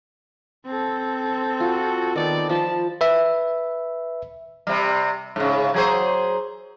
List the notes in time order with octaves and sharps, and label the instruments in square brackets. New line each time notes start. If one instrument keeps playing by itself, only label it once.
[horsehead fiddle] C4 A4
[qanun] F4 [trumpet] F#4
[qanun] D#3 B3 [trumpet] D5
[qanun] F3 B5 C6 [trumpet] A5
[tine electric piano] B4 E5
[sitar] C3 G3
G#2 C#3
F#3 G#4 C5